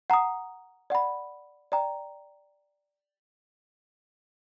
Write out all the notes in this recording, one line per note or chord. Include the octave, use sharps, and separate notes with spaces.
F#5 A#5 D#6
D5 F#5 B5
D5 G5 A#5